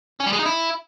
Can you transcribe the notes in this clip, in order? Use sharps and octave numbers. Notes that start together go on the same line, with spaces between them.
C#4
G3
G#3
D#4
E4